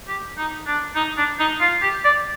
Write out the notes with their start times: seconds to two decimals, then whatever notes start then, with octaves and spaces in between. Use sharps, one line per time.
0.08 G4
0.38 D#4
0.67 D4
0.95 D#4
1.18 D4
1.39 D#4
1.60 F4
1.82 G4
2.04 D5